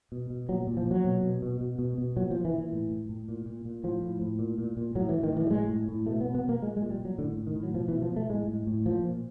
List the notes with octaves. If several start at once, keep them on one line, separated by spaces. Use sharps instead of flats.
B2
B2
A#2 F#3
A#2
F3
A#2
F#3
B2
B2
B2
B2
B2
B2
A#2 F#3
F3
A#2
E3
A#2
E3
A2
A2
A2
A#2
A#2
A#2
A2 F3
A2
A2
A#2
A#2
A#2
A2 F#3
E3
A2
D#3
A2 E3
G3
A2 G#3
A2
A2
B2 A3
B3
B2
B3
B2 A#3
A#2 G#3
G#3
A#2
G3
A#2
F#3
A2 D3
A2
D#3
A2
F#3
B2 F3
E3
B2
F3
B2 A3
A2 G#3
A2
A2
A#2 F3
A#2